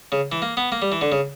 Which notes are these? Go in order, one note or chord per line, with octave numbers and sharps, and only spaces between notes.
C#3
E3
A#3
B3
A#3
G3
E3
D3
C#3